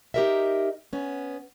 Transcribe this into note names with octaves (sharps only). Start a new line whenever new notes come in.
D#4 G4 G#4 A#4 D#5 E5
B3 C#4